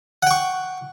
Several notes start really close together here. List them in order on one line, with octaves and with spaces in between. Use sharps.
F#5 G5 C#6